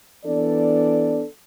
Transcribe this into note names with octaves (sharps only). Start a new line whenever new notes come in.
E3 B3 D4 A4 D5